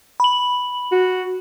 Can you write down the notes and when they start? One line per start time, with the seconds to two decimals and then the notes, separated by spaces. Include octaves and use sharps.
0.20 B5 F#7
0.92 F#4